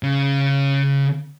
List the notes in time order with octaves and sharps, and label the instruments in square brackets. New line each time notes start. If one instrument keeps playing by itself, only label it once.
[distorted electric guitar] C#3